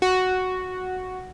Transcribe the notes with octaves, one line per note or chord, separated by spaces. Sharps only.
F#4